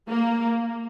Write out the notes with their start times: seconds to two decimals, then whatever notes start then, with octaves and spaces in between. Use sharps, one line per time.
0.10 A#3